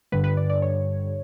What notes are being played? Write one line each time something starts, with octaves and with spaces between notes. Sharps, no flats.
G2 D3 G3 B4
B4
D5
D5
C#5